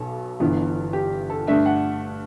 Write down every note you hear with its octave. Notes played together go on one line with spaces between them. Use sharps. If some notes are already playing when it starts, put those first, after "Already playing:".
Already playing: B1 B2 A4
G1 G2 E3 B3
G4
A4
G2 D3 A3 D4 E5
F#5